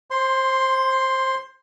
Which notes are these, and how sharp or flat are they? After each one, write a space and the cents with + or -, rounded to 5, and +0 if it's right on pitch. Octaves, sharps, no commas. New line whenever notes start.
C5 +20 C6 +0